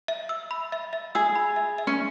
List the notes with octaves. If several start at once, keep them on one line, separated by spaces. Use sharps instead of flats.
E5
E6
B5
E5
E5
G#4 E6
B5
E5
E5
C#4